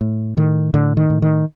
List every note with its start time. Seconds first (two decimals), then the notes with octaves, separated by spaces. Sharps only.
0.01 A2
0.37 A2 D#3
0.74 A2 D3
0.97 D#3
1.10 A2
1.22 D#3